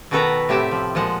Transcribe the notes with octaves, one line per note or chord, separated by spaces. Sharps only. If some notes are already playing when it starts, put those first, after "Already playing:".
B2 D#3 F#4 A4 B4 A#5
A2 C3 G4 E5 A5
F3
A#2 F3 G#3 F#5